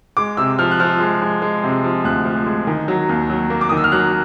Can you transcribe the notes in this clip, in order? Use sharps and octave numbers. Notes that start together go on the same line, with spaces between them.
G#3 D6
C3 E6
F3 F6
F#6
F3 F6
G#3
G#3
G#3
C3
F3
D2 F#6
F3
G#3
D#3
F#3
D#2
F#3
A#3
D6
D#3 D#6
E6
F6
F#3 F#6